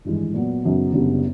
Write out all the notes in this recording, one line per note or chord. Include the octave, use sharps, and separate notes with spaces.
G#1 G2 E3 G#3
A#2 F#3 B3
F#2 C#3 F#3 B3 D#4
F#1 F#2 D3 G3 B3